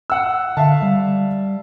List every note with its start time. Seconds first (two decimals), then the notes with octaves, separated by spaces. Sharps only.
0.10 F#5 E6
0.57 D3 E5 F5 A5
0.82 G3